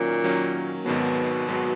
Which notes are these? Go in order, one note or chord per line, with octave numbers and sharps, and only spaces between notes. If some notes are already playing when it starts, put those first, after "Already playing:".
Already playing: A#2 D#3 F#3 A#3 C#4
D#3 F#3 A#3 C#4
G#1 G#2 B2 D#3 F#3
G#1 G#2 D#3 F#3